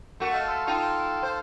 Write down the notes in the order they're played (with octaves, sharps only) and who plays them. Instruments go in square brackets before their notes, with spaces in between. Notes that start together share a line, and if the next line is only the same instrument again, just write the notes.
[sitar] A3 F#4 [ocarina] A#4
[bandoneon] A4 F5 A5 [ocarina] D#5
[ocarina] C6
[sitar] D#4 F4 [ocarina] G5
[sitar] C5